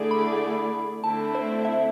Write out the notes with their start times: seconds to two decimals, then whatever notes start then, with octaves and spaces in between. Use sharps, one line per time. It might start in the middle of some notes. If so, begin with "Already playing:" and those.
Already playing: D3 A3 E4 G#4 D5
0.11 B5
1.03 D3 A3 C4 E4 A5
1.35 C5
1.65 E5